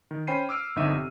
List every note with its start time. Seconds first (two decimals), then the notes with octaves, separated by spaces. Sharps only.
0.11 D#3
0.27 C#4 C5 G5 B5 C7 D#7
0.49 D6 E6 F6 D7
0.76 G1 F2 D3 D#4 E5 D#7
0.93 C3